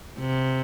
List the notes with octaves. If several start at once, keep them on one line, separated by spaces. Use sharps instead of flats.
C3